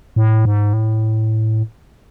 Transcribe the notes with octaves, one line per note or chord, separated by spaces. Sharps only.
A2
G#2
A2